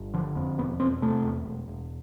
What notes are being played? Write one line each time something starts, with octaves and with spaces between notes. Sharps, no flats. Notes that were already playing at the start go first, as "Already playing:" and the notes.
Already playing: G1
D3 F3
F2
E1 B3
E1 C4
C3 A3
E2
E1
E1